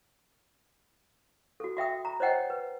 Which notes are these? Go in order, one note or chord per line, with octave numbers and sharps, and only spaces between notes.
F#4 A4
F#4 E5 G5 D#6
A#5 B5
C5 C#5 D#5 F#5 G5
B4